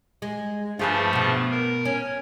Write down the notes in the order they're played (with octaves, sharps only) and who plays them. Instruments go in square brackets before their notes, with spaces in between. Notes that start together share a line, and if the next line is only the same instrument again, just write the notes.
[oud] G#3
[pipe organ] G2 F3 A3 [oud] F4 G#4 B4
[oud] B2 B3
[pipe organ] A#4
[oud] C#4